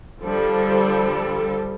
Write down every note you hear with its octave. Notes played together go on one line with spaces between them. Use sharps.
D3 F3 G3 A4